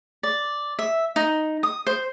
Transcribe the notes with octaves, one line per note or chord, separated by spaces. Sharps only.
D5
E5
D#4
D#6
C5